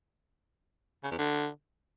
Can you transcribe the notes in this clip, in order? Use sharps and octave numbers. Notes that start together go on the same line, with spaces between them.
C#3
E2
D3